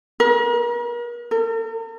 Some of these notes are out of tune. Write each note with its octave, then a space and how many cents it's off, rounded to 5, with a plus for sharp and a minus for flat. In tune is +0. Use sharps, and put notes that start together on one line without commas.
A#4 +40
A#4 -45